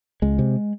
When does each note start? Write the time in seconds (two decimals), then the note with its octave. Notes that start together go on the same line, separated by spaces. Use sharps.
0.22 C#2 G#3
0.39 C3